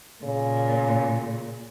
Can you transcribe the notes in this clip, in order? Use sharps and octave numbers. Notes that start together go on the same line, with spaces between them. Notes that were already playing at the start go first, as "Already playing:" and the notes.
A#2 C#3